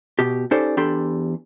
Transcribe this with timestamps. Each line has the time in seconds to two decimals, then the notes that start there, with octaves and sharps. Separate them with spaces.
0.19 B2 G4
0.51 C#4 D#4 G4 A4 C5 D5
0.77 E2 D4 G4 A4 B5 C6